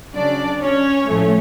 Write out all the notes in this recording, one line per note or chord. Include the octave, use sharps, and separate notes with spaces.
C#3 F#3 C#4 D4 D5
C#4 C#5
A2 F3 A3 C#4